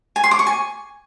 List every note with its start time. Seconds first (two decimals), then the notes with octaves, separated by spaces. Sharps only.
0.16 G#5
0.24 C6
0.31 D6
0.39 C#6
0.47 G#5